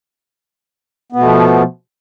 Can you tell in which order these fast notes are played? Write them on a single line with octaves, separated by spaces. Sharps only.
B3 B2 A3 F3